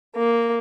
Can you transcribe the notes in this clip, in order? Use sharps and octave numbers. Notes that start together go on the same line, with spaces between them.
A#3